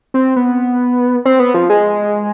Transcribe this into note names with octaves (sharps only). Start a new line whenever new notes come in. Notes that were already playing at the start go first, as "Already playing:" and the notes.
C4
B3
C4
B3
F3
G#3